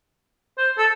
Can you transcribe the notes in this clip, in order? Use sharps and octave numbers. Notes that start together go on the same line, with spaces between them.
C5
A4